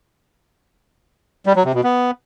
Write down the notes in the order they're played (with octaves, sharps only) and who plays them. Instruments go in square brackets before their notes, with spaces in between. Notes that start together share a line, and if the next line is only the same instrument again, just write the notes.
[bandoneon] G3
F#3
C3
B2
B3